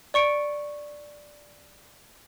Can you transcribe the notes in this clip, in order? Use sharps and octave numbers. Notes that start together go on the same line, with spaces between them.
D5 C#6 C#7 D7